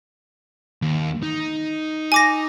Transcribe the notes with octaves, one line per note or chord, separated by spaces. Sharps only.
D#2
D#4
G#5 D6 A#6